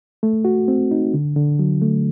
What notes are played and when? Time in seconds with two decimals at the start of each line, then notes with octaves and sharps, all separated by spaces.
0.23 A3
0.45 F#4
0.68 C4
0.91 D#4
1.14 D3
1.36 D3
1.59 F#3
1.82 A3